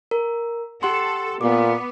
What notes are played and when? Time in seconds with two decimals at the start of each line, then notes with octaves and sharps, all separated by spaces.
0.11 A#4
0.83 G4 A4 F#5 C6
1.41 A#2 B3 D6